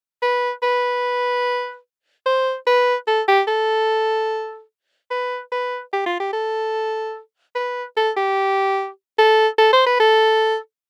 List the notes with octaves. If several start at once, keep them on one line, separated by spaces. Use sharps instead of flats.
B4
B4
C5
B4
A4
G4
A4
B4
B4
G4
F4
G4
A4
B4
A4
G4
A4
A4
C5
B4
A4